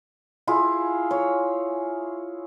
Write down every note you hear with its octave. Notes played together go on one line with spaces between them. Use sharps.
E4 F4 G#4
C#5